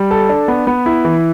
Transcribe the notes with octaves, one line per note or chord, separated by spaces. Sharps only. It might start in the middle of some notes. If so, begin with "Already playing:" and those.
Already playing: G3
A4
D4
B3
B3
E4
E3